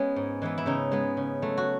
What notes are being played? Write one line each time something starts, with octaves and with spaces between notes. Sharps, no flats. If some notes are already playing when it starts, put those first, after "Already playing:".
Already playing: G#3 B3 C#4
G#2
E3 G#3 B3
E4
C#3 D#4
G#3 B3
C#3
F#3 A3
F#4